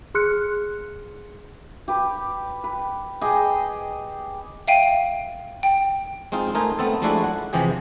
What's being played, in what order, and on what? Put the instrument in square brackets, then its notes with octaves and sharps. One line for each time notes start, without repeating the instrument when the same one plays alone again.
[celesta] G#4 C6 F6 F#6 C#7
[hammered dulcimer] G4 B4
B4
G4 G#4 D#5 G5
[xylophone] E5 F5 G5 D#7
G5
[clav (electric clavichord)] G#3 C4 D#4 F4
A3 D#4 A#4 C5 G#5
A3 B3 C4 A4
F3 G#3 A3 D4 E4 F#4
F#5
C3 E3 F3 G4 G#4